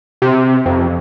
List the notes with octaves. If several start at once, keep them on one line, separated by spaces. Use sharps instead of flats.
C3
F2